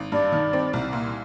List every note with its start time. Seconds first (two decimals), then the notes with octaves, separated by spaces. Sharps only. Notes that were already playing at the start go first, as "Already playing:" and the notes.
Already playing: G#1
0.12 G2 D5
0.32 D#3
0.53 C4
0.73 C2
0.93 A#2